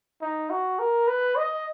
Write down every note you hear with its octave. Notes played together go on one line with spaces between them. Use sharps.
D#4
F#4
A#4
B4
D#5